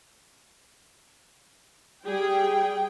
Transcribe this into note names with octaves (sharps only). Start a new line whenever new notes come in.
G3 G#4 G5